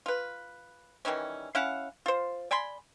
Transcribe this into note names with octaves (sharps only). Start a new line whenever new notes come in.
F4 B4
D#3 E3 G3 C#4
C#4 E4 F5 F#5
F4 C5
D5 G#5 B5 C6